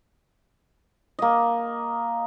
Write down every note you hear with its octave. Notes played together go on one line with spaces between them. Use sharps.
A#3 D#5